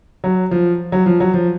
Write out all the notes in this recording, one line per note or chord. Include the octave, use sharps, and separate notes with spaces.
F#3
F3
F#3
F3
F#3
F3